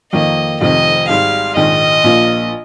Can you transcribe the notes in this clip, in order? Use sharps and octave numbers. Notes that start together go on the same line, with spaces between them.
F2 D#3 A#3 D#5
F1 F2 C3 D#3 D#5
G#1 G#2 G3 F5
A#1 G#2 D#3 D#5
A#1 A#2 F3 A#3